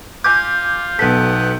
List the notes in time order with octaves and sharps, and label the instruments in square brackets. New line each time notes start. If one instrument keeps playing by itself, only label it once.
[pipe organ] F4 [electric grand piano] G#5 D6 [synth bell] G6
[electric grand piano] B1 A4 [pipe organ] B3 F#5 [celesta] B6